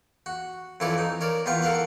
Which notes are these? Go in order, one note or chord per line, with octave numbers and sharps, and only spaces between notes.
F#4
F2 E3 A4 C#5 D5
D#4
A#4 C#5 D5
E2 B3 F4 G5 C#6
A4 A#4 F5 F#5